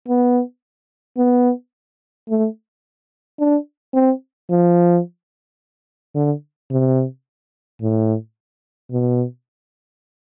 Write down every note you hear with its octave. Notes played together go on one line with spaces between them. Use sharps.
B3
B3
A3
D4
C4
F3
D3
C3
A2
B2